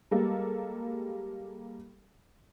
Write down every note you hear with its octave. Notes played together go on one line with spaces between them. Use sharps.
G3 G#3 A#3 A4 A#4